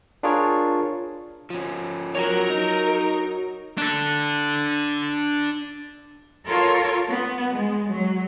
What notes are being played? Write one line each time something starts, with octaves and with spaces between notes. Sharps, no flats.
D4 F4 G#4 A#4 C#5
F3 C#4
F#4 A#4 C#5
D#4
D4 A4
F4 A4 A#4 C#5
B3
G#3
F#3